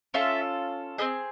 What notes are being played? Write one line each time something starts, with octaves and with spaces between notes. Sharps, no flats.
C#4 F4 A4 E5
C4 E4 G#4 D#5